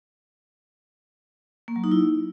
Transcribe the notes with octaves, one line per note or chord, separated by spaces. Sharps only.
A#3
F#3
D#4
E4